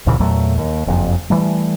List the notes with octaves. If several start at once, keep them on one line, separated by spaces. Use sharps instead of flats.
D2 A#2 C#3 E3
E2 A#2 F#3 A3
D#2
F#1 F2
E3 G3 A3